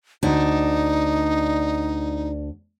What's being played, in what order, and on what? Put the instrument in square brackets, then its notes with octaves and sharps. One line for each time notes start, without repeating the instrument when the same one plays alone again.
[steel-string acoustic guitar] D2 D4 [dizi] D#4